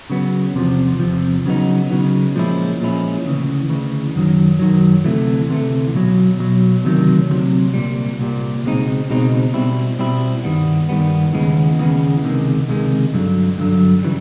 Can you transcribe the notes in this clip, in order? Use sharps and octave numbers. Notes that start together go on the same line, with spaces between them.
C#3 F#3 B3
E2 C3 F3
E2 C3 F3
C#3 F#3 B3 D#4
C#3 F#3 B3 D#4
A#2 F3 G#3 C#4 E4
A#2 F3 G#3 C#4 E4
D2 C#3 E3
D2 C#3 E3
F#2 D#3 F#3
F#2 D#3 F#3
D2 C3 E3 A3
D2 C3 E3 A3
B1 B2 F#3
B1 B2 F#3
D2 C3 D#3 F#3
D2 C3 D#3 F#3
C2 A#2 G3
C2 A#2 G3
C#2 B2 G#3 C4 D#4
C#2 B2 G#3 C4 D#4
B2 G3 C4 E4
B2 G3 C4 E4
G2 D#3 G3 B3
G2 D#3 G3 B3
D#2 C#3 E3 G#3 B3
D#2 C#3 E3 G#3 B3
C#2 C3 D#3 G#3
C#2 C3 D#3 G#3
G2 D3 F#3
G2 D3 F#3
C#3 E3 G3